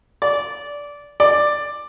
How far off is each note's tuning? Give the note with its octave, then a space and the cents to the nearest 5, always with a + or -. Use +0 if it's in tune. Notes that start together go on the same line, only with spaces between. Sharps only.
D5 -15
D5 +10